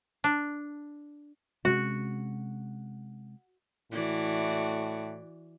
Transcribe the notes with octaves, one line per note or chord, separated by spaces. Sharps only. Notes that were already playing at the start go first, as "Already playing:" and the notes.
D4
C3 G#3 C#4 F#4
A2 E3 F#4 D5